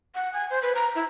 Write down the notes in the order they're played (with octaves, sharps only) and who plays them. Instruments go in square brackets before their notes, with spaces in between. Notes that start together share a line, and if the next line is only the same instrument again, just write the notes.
[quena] F#5
G#5
C5
B4
A#5
E4